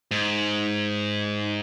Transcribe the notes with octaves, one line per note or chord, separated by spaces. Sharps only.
G#2